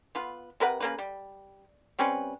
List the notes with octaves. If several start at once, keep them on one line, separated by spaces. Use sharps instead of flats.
B3 F4 B4
C3 A#4 B4 F#5
C#3 A#3 B4
G3
G3 C4 C#4 B4